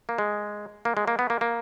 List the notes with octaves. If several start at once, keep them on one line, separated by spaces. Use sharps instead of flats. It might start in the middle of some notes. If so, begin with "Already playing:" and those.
A#3
G#3
A#3
G#3
A#3
B3
A#3
A#3